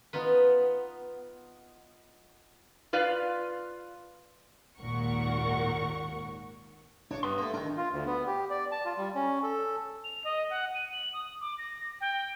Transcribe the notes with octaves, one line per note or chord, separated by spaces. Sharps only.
B3 D#4 F4 B4
F4 B4 D5 F5
G#1 D#2 A#2 A#4 F#5 C#6
D4 C#5 C#6 D6
G2 B3 C6
A3 A#3
D#3 D4 A#4
F4
D2
B3
G4
D5
A5
F4
G3
C#4
A4
F7
D#5
F#5
D#7
F#7
D#6
D6
A#6
G5